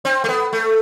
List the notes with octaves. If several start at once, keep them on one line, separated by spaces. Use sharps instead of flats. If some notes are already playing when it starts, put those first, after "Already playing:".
C4
A3
B3
A3